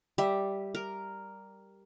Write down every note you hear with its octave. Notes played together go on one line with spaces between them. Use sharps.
G3 E5
A#4